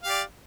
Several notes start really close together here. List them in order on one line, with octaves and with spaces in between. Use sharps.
F5 G4 D5